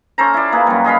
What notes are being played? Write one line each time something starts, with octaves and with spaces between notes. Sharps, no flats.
C#4 A4 C5 A#5
E4 D5
A#3 G#4 B4
F#2 G3
G#4 D#5 F5 B5